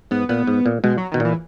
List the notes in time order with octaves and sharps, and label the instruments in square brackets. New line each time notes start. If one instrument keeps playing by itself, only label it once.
[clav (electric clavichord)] G#2 [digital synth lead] B3
[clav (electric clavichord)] A#2 [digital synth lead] B3
[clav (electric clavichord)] G#2
A#2
[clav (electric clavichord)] B2 [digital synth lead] G#3
[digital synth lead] F#3
[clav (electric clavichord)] B2 [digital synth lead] D#3
[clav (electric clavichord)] A#2 [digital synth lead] E3